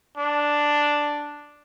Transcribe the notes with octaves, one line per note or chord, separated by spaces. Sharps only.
D4